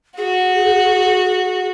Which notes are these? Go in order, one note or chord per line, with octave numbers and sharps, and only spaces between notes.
F#4 G#4